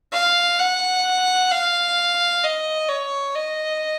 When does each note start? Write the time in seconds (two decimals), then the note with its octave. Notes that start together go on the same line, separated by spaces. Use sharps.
0.13 F5
0.59 F#5
1.51 F5
2.43 D#5
2.88 C#5
3.35 D#5